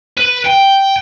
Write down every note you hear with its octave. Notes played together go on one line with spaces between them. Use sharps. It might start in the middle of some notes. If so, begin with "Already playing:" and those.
B4
G5